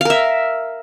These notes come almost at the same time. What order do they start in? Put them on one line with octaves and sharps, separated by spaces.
F5 A#4 E5